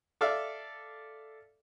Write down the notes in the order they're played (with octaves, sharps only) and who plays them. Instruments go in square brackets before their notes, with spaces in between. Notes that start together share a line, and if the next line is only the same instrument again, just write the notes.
[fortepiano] A4 D5 E5 F5